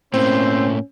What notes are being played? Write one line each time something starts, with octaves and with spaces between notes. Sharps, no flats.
A2 A#3 C4 C#4 C5